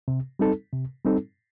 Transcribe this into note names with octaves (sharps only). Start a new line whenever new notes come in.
C3
G3 C4 D#4 A4
C3
G3 C4 D#4 A4